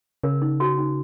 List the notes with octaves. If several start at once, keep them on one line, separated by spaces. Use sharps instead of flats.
C#3 A#4
D#4
F#4
D#4